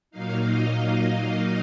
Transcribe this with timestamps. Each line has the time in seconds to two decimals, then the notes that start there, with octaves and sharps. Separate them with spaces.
0.11 A#2 F#3 A#3 D#4 F5
0.44 D#5
0.77 F5